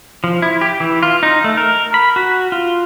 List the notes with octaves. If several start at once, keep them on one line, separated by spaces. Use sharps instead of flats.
F3
E4
G4
E3
F4
D#4
A3
A#4
B5
F#4
F4